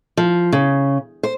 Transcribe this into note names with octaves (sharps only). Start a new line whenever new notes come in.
F3
C#3
C5